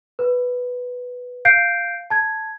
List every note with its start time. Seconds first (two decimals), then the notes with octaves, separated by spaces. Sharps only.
0.19 B4
1.45 F5 G6 C7 D7
2.10 A5 G#6